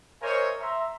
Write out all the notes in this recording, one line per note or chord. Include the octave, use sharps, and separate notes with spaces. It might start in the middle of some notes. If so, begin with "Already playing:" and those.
A#4 C5 C#5 D#5 E5 G#5
E5 A#5 C6